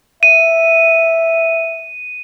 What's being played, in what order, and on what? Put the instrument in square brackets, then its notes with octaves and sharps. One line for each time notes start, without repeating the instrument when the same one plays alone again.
[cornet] E5 [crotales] D#7